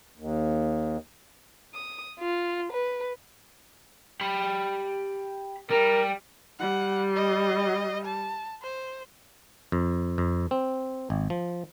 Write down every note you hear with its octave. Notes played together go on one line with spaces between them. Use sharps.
D#2
D#6
F4
B4
G4 B5
G3 A#4
G3 F#5
D#5
A5
C5
F2
F2
C4
G#1
F3